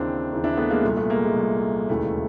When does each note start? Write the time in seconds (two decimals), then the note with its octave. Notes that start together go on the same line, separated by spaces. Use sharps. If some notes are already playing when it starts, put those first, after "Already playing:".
Already playing: D#2 C#3 E3 C4 D4
0.31 D#2 C#3 E3
0.44 D4 E4
0.57 A3 B3
0.70 G#3 A#3
0.83 C2 A#2 A3
0.96 A3 B3
1.10 G#3 A#3
1.24 G#3
1.36 C2 A#2
1.89 E1 D#2 C#3 E3 A3